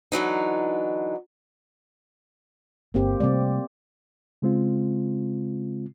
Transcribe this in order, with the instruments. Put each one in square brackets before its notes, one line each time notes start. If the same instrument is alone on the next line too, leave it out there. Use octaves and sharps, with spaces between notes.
[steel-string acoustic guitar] D3 E3 F#3 D#4
[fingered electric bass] G1 [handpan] A#3 C4 G4
[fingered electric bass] C3 G3 A3 [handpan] C4 D5
[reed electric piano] C#3 G#3 C4 F4